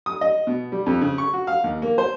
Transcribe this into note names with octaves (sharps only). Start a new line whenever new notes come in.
D#6
D#5
B2
G3
F2
C#3
C#6
F#4
F5
D#2
A#3
C5